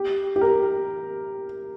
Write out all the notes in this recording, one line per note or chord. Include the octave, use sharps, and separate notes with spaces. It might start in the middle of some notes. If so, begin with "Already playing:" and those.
Already playing: G4
G4
A#4